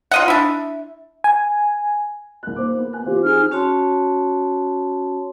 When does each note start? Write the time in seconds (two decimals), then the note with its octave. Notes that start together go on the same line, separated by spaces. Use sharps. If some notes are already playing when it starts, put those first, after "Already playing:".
0.11 F4 D#5 F#5
0.28 D4 E4
1.24 G#5
2.43 C2 F#6
2.56 A#3 D#4 C5 D6
2.78 B3
2.93 G#5 F#6
3.06 E3 C4 F4 G4
3.23 D#4 G#4 F6
3.51 C#4 F#4 C#5 A5 C6